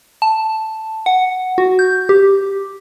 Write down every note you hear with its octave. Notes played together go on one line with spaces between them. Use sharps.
A5
F#5
F#4
G6
G4